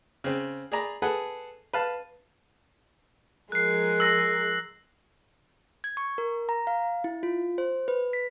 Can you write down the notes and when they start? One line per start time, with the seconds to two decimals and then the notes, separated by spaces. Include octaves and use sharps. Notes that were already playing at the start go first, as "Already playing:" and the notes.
0.24 C#3 C4
0.72 G#4 D5 A#5 B5
1.02 G#4 A4 B4 F#5
1.73 B4 F5 A5
3.52 F3 G#3 A#4 F#6 C7
4.00 E6 A#6
5.84 G#6
5.97 C#6
6.18 A#4
6.49 A#5
6.67 F5
7.04 E4
7.23 F4
7.58 C5
7.88 B4
8.13 B6